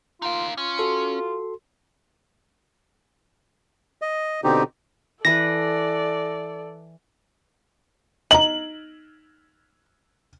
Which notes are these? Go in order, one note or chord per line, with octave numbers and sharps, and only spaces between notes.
D#4 F4 F5
C#4 F4
F#4 A4 C6
D#5
B2 D3 C4 D#4 G4
E3 A4 B4 D5 A#6
D#4 A#5 F#7